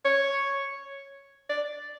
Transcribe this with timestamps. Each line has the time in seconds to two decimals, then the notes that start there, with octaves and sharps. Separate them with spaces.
0.05 C#5
1.49 D5